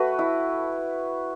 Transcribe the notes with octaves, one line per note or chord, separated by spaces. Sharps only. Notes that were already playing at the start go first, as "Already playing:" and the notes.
Already playing: A3 F#4 B4
E4